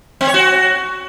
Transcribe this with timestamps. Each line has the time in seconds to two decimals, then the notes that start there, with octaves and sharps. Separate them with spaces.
0.21 C4
0.27 C#5
0.34 F#4